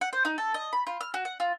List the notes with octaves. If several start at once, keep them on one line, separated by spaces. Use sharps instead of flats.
F#5
C5
D#4
A4
D#5
B5
F4
F6
F#4
F#5
F4